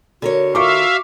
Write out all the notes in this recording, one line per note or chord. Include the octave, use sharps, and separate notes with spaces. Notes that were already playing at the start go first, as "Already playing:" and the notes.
D3 F#4 A#4 C#5
D#3 F4 E5 F5 C#6 D6